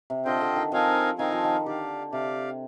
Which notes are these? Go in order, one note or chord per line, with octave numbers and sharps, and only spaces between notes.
C3
D3 C4 F4 C5 D#5 G5
D3
D#3
F3 C4 D#4 A#4 F5 G#5
D#3 C4 D#4 A#4 F5 G#5
F3
D#3
D3 G4 D5 F5
C3 G4 D5 F5